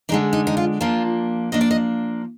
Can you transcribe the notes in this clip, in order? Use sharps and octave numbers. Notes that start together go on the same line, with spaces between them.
D3 G#3 D4 D#4
D#4
D#4
F4
F3 A#3 D4 F4
F3 A#3 D4 D#5
D5
D#5